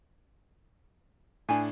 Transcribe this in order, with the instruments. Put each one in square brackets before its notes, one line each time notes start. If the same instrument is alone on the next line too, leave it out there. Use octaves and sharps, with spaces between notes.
[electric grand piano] A2 D4 [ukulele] G#5